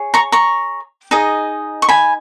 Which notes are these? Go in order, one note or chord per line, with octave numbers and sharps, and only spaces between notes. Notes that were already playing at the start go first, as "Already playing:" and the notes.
Already playing: G#4 C#5
A#5 C#6
A#5 C#6
D#4 G#4 D#5
C#6
G#5 B5